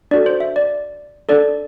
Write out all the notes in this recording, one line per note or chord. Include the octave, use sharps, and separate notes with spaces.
D4 F#4 A4 D5
C5
E5
D5
D4 A4 D5